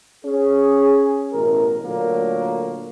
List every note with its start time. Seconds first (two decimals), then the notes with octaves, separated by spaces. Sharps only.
0.25 C#4 G#4
1.33 A1 B2 A#4
1.83 A#2 D3 F#3 A3 A#3